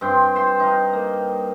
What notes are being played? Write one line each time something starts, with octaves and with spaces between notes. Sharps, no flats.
G2 C4 G5 C6
C5 G5 C6
D#4 D#5 F5
A#3